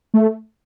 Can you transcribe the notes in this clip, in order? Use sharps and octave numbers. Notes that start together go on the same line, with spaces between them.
A3